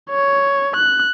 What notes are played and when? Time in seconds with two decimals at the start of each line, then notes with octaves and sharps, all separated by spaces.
0.10 C#5
0.76 F#6